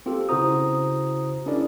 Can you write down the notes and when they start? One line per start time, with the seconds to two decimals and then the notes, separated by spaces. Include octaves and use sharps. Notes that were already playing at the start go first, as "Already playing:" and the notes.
0.06 C4 F4 G4 A4
0.29 C#3 E4 F#4 C5 A#5 D#6
1.46 C#4 D4 E4 G#4 A#4 D5